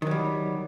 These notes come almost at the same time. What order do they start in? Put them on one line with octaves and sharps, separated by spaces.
D#3 F#3 G3